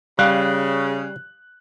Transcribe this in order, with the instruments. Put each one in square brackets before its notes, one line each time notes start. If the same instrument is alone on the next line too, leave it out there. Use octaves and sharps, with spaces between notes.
[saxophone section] C#3 [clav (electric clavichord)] G3 [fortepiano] F5 [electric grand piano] F#6